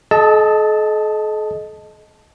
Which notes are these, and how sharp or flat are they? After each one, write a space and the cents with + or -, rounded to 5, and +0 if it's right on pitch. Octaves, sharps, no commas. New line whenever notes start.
A4 -45 D#5 +0 A5 +0